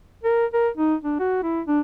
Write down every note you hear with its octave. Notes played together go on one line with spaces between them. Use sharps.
A#4
A#4
D#4
D4
F#4
E4
D4